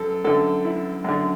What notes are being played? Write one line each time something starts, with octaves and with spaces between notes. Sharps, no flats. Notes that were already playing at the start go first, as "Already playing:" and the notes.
Already playing: F#2 A4
F#2 D3 A4
E4
F#2 D3